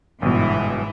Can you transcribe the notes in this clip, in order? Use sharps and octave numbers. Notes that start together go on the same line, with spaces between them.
G1 G#2 B2 E3